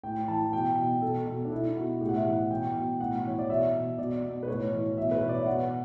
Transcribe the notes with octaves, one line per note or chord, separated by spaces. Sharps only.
A2 G5
E3 A5
B2 G5
B2
B2 A4
B2
D4
B2 E4
B2 F#4
A2 G4
F#5
E5
E3 F#5
F#5
B2 G5
B2
A2 F#5
E3 C#5
D5
B2 E5
B2
B2 D5
B2
B4
A2 C#5
E3
B2 E5
B4
B2 C#5
D5
E5
B2 F#5